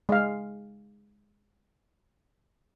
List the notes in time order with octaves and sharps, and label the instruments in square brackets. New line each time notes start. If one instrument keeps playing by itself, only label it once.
[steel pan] G#3 F5